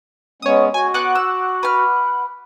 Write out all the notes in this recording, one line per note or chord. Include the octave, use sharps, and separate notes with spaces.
G#3 B3 C#4 C#5 D#6
F#4 G#5
B3 F#5 D6 F#6
E6
B4 F6